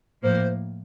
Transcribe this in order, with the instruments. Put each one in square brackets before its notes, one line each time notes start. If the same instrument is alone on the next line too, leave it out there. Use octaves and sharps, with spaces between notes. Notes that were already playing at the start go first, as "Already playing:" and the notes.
[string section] A2 F3 A#3 [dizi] C5